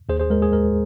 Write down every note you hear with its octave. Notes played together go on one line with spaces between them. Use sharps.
D#2 G#4 C5
G#4 C5
G#3 A#4
G#4
G#3 A#4